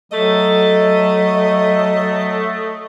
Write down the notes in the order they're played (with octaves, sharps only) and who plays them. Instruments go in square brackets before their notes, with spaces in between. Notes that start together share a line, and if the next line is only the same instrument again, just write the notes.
[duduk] F#3 [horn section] A3 [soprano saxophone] D#5